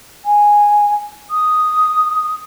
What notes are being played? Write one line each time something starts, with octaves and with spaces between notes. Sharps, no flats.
G#5
D#6